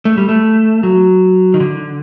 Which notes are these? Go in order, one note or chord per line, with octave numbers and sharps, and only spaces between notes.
A3
G3
A3
F#3
D#3
D3